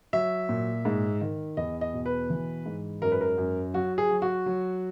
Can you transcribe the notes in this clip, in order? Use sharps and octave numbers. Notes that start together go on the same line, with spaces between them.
F#3 E5
A#2
G#2
D#3
E2 D#5
D#5
B2
B4
E3
G#2
F#2 A#4
B4
A#4
F#2
F#3 F#4
G#4
F#3
F#4
F#3